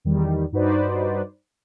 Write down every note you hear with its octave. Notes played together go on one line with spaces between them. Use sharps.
E2 D#3 G3
G2 D#4 F#4 B4 C5 D5